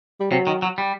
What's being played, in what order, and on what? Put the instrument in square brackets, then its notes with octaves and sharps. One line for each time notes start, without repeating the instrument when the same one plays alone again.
[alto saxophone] G3
[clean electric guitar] C3 [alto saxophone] F#3
[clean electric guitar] D#3
F#3
G3